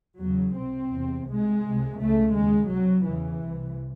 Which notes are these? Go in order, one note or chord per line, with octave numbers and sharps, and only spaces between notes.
E2 C#3 F#3
C2 C3 C4
E2 C3
C2 C3 G#3
C2 C3
C#2 C#3 A3
D#2 C#3 G#3
C2 C3 F#3
E2 C#3 E3
C2 C3